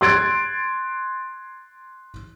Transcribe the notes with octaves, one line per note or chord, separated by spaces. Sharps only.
C6 F#6 G#6 A6 D7